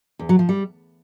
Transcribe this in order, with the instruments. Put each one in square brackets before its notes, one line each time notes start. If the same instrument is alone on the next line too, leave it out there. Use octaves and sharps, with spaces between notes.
[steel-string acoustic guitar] E2
F#3
F3
G3